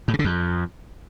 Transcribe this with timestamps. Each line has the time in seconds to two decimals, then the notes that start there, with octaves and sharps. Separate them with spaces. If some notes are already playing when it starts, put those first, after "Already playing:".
0.08 A2
0.13 C#3
0.19 D3
0.24 F2